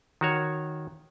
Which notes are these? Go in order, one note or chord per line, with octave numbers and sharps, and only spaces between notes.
D#3 F#4 C#5